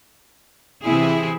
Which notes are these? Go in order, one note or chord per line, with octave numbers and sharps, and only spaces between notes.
C3 E3 C4 E4 G#4